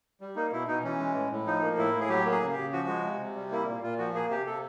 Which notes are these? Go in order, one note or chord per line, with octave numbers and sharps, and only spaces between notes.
G3
A#3 D#4
B2 E4
B2 D#4
E3 C#4
G#3
A2
A2
F3 D#4
A#3
A2 E4
A2
G#4
F#3 G4
A#3
G#4
C#3
G4
C#3
F3 F#4
G#3
C3
C3
G3
A#3 E4
A#2
A#2 F4
F3 F#4
A#3 G#4
C3 G4
C3 A4